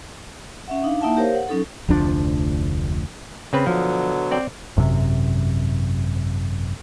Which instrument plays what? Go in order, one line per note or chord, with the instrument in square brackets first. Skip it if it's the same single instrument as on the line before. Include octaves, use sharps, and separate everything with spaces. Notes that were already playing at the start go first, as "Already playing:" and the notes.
[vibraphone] C#4 E5 F#5
D4 D#4 F5
A#3 D#4 E4 E5 F#5 A5
G4 A#4 C5 C#5 F5
F#5
F#3 C#4 D#4 A4
[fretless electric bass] F1 D2 F3 D4
[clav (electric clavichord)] C#3 C4 B4
[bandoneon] B2 D3 F#3 [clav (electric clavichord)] F3
[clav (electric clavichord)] C4 D5 G5
[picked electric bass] G#1 F#2 A2 C3